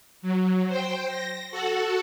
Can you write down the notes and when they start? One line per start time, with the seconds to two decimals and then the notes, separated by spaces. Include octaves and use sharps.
0.22 F#3
0.69 C5 G5
1.08 A#6
1.51 F#4 A4 F#5